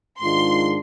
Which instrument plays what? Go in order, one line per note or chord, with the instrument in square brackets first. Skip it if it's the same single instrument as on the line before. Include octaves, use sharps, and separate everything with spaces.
[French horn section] G#2 D#3 G#3 D4 F4 [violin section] C6